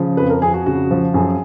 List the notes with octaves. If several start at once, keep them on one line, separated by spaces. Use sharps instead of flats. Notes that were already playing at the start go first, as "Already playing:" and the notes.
Already playing: C#3 F3
F2 B4
A#4
F2 G#4
F#4
C#3 F#4
F3
F#2 G#4